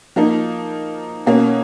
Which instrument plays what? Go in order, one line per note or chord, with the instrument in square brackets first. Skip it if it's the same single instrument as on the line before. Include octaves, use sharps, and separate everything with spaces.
[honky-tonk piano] F3 A#3 D#4
B2 A#3 C#4